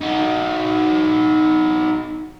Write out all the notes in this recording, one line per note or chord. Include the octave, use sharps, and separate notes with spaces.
D#4 F#4